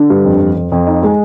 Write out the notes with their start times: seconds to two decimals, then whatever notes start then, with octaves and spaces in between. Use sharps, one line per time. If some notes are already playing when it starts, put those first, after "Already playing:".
Already playing: D3
0.10 G2
0.25 F2
0.41 F2
0.56 F2
0.72 F2
0.87 D#4
1.03 G#3